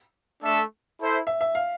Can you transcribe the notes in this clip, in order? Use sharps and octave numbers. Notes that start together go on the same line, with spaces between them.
A3 D4 A4 E5
E4 A4 C5 E5
E5
E5
F5